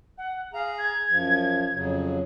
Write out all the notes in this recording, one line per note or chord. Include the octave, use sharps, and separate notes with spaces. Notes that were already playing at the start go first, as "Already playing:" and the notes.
F#5
G#4 F5 A#5
G#6
F#2 F3
F2 C#3 F#3